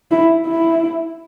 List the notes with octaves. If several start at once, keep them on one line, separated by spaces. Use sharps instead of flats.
E4
E4